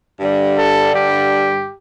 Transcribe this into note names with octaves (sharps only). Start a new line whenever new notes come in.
G2 D3 G3
A4
G4